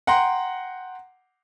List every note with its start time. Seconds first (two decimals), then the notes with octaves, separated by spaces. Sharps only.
0.07 F#5 G5 A#5 C6